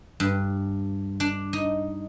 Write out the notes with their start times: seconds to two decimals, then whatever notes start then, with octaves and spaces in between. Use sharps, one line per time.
0.20 G2
1.20 D4
1.53 D#4